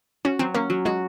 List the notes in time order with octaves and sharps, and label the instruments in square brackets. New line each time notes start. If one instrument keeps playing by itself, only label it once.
[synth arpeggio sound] C#4 [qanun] F#4
[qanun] F#3 [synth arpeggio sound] C4
[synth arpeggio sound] A#3 [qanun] C#4
[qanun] F#3
[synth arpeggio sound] G#3 [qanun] F#4